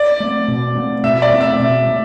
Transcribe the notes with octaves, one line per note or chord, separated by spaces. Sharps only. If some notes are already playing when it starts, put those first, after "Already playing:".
Already playing: D5
A3 C4
B2
A3 C4
B2 E5
D5
A3 C4
E5
B2
A3